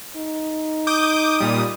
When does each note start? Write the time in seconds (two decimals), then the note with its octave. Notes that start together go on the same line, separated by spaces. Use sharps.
0.16 D#4
0.87 D6 D#6 G6
1.39 A#2 G3 D#6